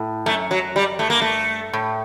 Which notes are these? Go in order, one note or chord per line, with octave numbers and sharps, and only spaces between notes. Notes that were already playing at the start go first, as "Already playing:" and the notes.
Already playing: A2
F#2 A3
F#3
G3
G2 A3
A#3
A3
A2